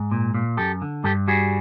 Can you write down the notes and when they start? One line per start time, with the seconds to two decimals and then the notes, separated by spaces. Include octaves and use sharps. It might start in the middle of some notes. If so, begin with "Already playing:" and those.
Already playing: G#2
0.11 A#2
0.34 A#2
0.57 F#2 G4 A4
0.82 D3
1.04 G2 G4 A4
1.28 G3 F#4 G#4